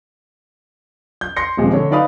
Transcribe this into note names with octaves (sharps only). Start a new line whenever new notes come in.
G6
C6 G6 A#6 C#7
D#1 C3 F3 G#3
D3 C#5
D#4 B4 D5 F5 B5 D#6